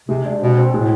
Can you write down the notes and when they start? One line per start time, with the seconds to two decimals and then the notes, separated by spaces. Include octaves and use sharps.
0.09 C3 G#3
0.25 C3 D4
0.42 B2 C4
0.58 C4
0.74 A2 G#3